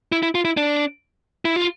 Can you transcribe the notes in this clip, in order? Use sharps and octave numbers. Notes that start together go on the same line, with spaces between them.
E4
E4
F4
E4
D4
E4
F4